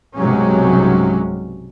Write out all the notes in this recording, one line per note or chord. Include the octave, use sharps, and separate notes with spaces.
B1 G2 C3 F#3 G#3 C#4